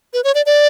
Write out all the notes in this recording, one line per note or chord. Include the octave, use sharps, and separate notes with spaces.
B4
C#5
D5
D5